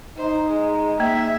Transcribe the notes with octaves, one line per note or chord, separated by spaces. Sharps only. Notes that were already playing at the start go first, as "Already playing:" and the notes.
D#4 C5
G#3
A#3 E5